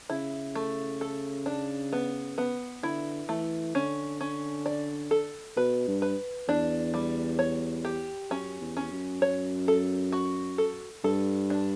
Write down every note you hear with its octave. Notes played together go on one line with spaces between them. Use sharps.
C#3 E4
A3
A4
D4
B3
B3
D3 E4
E3 A3
D3 C#4
C#4
D5
A4
B2 B4
G2
B4
E2 D4
G3
C#5
G4
F#2 C#4
E2
C#4
F#2
F#2 C#5
A4
F#4
A4
G2 A4
D4